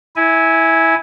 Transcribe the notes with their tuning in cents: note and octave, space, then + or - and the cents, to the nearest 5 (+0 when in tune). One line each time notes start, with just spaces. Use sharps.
E4 -15 G#5 +0